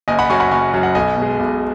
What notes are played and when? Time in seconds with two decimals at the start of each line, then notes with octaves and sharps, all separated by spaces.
0.08 F#1 D#5 G#5
0.19 F#5 B5
0.29 F#2 F#3 G#5 C#6
0.40 F#5 B5
0.51 F#1 G#5 C#6
0.73 F#2 F#3
0.83 F#5
0.95 B1 D#5 G#5
1.16 B2
1.22 G#3
1.39 B1